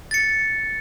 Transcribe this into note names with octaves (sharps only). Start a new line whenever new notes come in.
A6 C#7